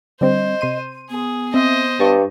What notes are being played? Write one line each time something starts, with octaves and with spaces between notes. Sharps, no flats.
D3 G3 C4 C5 D#5
C3 C6 D#7
B3 G#4
C4 C5 D#5 E5
G2 A5 C#6 D6